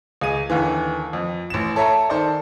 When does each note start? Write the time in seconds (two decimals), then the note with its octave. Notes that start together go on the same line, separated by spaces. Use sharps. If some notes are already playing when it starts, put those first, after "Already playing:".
0.21 C#2 G#4 D#7
0.50 D#2 D3 E3
1.13 F2
1.50 A1 E7
1.76 A4 C#5 E5 A5 A#5
2.10 D#3 A4 C5 D5